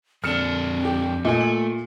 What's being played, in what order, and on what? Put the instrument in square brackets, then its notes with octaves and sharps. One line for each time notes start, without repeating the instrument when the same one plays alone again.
[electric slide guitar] F2 D3 D4 [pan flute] C4 [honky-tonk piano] F6 C#7 E7
[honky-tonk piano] G4
[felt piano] A#2 [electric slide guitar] A3 [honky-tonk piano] D#5 G#5
[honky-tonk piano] F#7